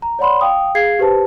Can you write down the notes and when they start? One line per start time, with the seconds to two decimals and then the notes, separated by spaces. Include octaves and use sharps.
0.02 A#5
0.19 C#5 D5 F#5 B5 C6
0.41 F5 G5 D#6
0.75 G#4 F5 G#6 C7
0.99 G4 B4 C5 A5